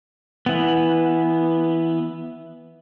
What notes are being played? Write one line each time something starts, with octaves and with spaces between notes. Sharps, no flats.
E3 B3